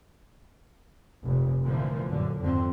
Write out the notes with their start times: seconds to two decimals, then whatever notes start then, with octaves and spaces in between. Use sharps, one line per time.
1.22 F1 A#2
1.64 A#2 D3 E3 F3 A3 A#3
2.08 A#1 F#2 D3
2.40 G#1 F2 D3 C4